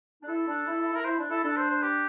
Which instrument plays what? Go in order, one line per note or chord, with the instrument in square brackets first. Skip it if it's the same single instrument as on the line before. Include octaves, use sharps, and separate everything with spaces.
[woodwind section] D4
[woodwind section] E4 [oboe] A4
[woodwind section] D4
E4
E4
[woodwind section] E4 [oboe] A#4
[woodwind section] E4 [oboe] C5
[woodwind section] D4
[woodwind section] E4 [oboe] A4
[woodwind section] D4 [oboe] A4
[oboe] C5
C5
G4